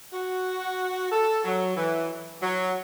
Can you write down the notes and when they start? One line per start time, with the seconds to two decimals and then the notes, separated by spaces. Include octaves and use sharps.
0.13 F#4
1.12 A4
1.45 F#3
1.76 E3
2.42 F#3